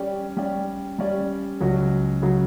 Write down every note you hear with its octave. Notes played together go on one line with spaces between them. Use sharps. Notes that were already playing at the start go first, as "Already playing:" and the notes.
Already playing: G3 C#4 G4 D5
G3 C#4 G4 D5
G3 C#4 G4 D5
C#2 C#3 F#3 C#4 F#4
C#3 F#3 C#4 F#4